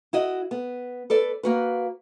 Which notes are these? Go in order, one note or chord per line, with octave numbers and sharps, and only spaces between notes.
E4 F#4 D#5
B3
A4 B4 D5
A#3 F#4 B4